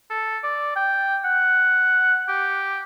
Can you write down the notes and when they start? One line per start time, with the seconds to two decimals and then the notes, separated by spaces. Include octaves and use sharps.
0.11 A4
0.43 D5
0.76 G5
1.25 F#5
2.29 G4